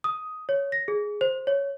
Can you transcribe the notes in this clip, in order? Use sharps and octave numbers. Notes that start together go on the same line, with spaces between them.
D#6
C#5
A#6
G#4
C5
C#5